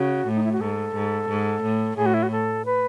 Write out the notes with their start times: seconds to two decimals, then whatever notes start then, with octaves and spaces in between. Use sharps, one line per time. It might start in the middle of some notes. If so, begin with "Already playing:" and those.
Already playing: C#3 F#4
0.27 A2
0.35 D#4
0.44 E4
0.52 F#4
0.60 G#2 A4
0.95 G#2
1.29 G#2
1.62 A2
1.96 A2 G#4
2.06 F#4
2.14 E4
2.23 F#4
2.31 A4
2.65 B4